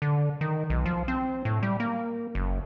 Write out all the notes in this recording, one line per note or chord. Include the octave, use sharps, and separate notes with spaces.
D3
D#3
B1
F3
C4
A2
G3
A#3
F#1